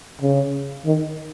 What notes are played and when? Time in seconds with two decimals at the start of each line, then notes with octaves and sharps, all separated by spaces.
0.21 C#3
0.85 D#3